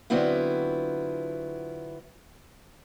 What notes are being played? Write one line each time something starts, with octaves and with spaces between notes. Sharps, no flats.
D3 F#3 B3 C4 E4 F4